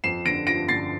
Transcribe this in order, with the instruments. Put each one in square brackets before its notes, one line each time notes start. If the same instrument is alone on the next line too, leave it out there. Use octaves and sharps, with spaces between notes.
[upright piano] F2 C7 E7
D3 A#6 D7
F3 A#6 D7
D3 A6 C7